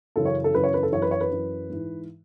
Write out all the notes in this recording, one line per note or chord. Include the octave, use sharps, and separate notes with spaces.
F#2 C#3 E3 A4
C#5
A4
F#2 C#3 E3 B4
C#5
B4
A4
F#2 E3 C#5
B4
C#5
B4
F#2 E3
G#2 E3